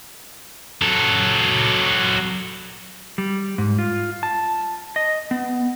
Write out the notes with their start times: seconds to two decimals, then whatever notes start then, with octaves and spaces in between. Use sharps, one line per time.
0.82 F#3 A4
3.18 G3
3.58 G#2
3.79 F4
4.23 A5
4.96 D#5
5.31 B3